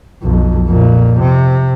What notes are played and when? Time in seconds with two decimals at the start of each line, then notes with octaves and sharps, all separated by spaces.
0.23 B1 F2
0.67 F2 A#2
1.20 C3